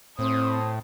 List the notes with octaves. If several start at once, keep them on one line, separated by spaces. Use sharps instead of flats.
A2 C4 C5 D#6